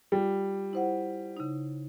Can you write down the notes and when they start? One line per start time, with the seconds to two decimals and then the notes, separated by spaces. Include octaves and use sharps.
0.12 G3 F4
0.73 E4 C5 F#5
1.37 C#3 D#4